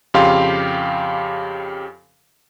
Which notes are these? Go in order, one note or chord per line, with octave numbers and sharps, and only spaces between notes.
F2 C#3 G4 F5 C6